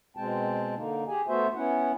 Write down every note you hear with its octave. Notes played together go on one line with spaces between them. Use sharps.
B2 G#3 C4 G5 A5
D3 A#3 D#4
G4 G#4 G#5
A3 B3 F#4 C5 E5
B3 C#4 E4 F#5